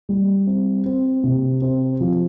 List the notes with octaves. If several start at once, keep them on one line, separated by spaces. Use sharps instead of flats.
G3
C4
C4
C3
C4
F3